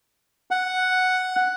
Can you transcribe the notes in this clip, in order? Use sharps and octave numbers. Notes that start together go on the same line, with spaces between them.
F#5